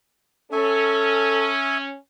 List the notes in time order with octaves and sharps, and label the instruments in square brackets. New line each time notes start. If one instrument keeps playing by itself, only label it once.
[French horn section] C#4 [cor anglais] A4 [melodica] C#5 E5 G#5